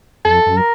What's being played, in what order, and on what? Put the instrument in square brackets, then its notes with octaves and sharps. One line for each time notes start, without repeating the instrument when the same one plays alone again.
[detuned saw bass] F2 [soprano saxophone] A4
[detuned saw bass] F#2
[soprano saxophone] A#4